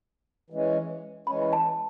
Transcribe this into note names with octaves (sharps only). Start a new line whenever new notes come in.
E3 G#3 C#4
E3 G#3 C#4 B5
A5